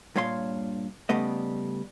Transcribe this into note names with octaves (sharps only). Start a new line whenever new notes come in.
G2 A#2 C#5 F5 C6
C#3 G3 A3 B3 D#5